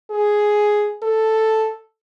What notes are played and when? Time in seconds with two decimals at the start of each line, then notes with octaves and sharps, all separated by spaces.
0.10 G#4
1.03 A4